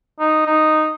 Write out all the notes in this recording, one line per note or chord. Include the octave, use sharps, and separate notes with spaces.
D#4
D#4